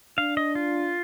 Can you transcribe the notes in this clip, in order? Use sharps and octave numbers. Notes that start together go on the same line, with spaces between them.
D4 F5
D#5
F4